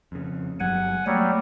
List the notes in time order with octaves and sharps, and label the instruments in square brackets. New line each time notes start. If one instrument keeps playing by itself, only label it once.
[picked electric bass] F2 C#3
[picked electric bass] G1 F#3 G3 [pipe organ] F#5 G#5
[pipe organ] F#3 G3 [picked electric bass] A3 A#3